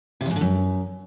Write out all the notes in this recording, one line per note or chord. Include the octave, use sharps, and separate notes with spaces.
C3
E2
G#2
D3
F#2